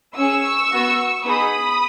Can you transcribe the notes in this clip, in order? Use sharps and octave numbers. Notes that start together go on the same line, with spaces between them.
C#4 G#4 C#6 E6
B3 F#4
B3 D#4 G#4 B5 D#6